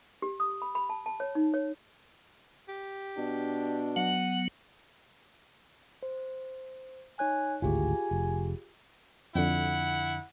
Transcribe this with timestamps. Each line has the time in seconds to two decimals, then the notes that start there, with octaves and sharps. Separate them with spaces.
0.22 G4
0.40 D#6
0.62 B5
0.75 B5
0.90 A5
1.06 A5
1.20 C#5
1.35 D#4
1.54 C#5
2.69 G4
3.18 B2 D4
3.96 F#3 B3 F#5
6.03 C5
7.19 D#4 C#5 G#5 F#6
7.62 G#1 D2 A2 F4 G4 G#4 G#5
8.11 F1
9.35 F2 D3 E4 F#5